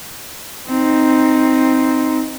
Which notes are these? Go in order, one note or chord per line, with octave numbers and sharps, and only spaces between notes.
C4 D#4